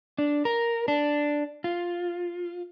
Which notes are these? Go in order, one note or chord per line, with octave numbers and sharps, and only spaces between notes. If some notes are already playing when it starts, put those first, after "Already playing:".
D4
A#4
D4
F4